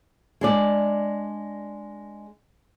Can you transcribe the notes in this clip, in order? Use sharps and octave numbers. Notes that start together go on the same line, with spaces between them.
G#3 D4 D5